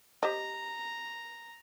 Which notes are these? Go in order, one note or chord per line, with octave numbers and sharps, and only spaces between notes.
G4 C5 D#5 A#5